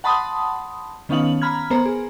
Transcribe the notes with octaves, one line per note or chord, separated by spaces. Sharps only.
F#5 A5 B5 C6 D#6
D#3 B3 C#4 D#4 F5 F#7
A#5 B5 F6 G#6
B3 A#4 C5 A#5
G#4